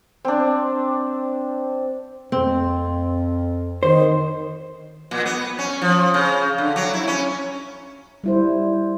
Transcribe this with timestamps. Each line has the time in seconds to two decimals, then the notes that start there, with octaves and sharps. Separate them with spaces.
0.25 C4 D4
2.32 F2 C4
3.83 D#3 C5
5.11 A#2
5.26 B3
5.59 C#4
5.82 F3
6.14 C#3
6.58 D3
6.76 F#3
6.94 E4
7.08 C#4
8.24 G3 E4 C5